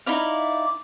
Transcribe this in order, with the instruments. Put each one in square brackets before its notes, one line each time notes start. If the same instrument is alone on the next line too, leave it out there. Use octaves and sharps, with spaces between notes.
[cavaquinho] D#4 E4 D5 F5